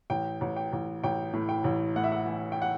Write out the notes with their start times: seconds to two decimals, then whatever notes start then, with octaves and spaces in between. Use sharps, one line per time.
0.10 A1 G5
0.41 A1
0.56 G5
0.73 A1
1.04 A1 G5
1.33 A2
1.49 G5
1.64 A1
1.96 A2 F#5
2.04 E5
2.12 F#5
2.27 E3
2.52 G5
2.62 F#5